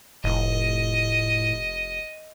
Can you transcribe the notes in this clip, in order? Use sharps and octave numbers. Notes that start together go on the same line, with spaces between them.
F1 A2 D#5